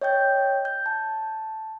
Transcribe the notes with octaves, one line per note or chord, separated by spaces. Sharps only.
C#5 D#5 G5 G6
G6
A5